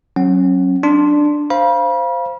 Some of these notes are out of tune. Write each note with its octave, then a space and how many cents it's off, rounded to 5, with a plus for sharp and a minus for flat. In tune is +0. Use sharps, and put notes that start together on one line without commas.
F#3 +10 C#4 -30 F#5 +10
D4 +5 C6 +0
C5 +0 F5 -10 B5 -35